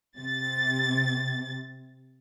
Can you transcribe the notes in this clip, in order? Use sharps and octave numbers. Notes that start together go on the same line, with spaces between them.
C3 A6